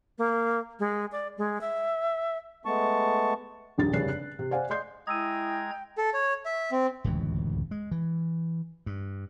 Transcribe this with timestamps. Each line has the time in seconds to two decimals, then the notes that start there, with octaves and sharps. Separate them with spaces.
0.18 A#3
0.79 G#3
1.12 D5
1.38 G#3
1.61 E5
2.66 G#3 A3 B3 A5 C#6
3.78 E1 A#1 G2 D#3 D#4 A6
3.93 F1 G2 C#3 F#6 C7
4.09 F#6
4.39 C3
4.51 C5 D5 F5 F#5 G#5
4.70 D5 D#5 C6 G6 C7
5.07 G#3 E4 G5 A#5 D#6 E6 G#6 D#7
5.98 A4
6.14 C#5
6.46 E5
6.72 C4
7.04 D1 C#2 F#2 E3
7.71 G#3
7.91 E3
8.86 G2